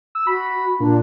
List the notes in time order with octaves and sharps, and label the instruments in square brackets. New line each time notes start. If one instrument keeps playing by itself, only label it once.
[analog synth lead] E6
[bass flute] F#4 [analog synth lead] B5
[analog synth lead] A#2 [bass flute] D4